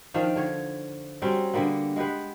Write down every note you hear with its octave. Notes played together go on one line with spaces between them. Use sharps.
D#3 F3 D4 F5
D3 C#5
F#3 G3 C4 C#4
D3 G3 A#3 B3
G#3 B3 G4 B4